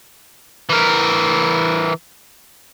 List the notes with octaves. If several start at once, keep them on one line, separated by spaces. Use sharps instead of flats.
E3 A#4